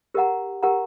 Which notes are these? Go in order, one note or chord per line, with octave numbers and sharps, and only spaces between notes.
G4 A#4 D#5 F#5 A#5
G4 A#4 D#5 F#5 A#5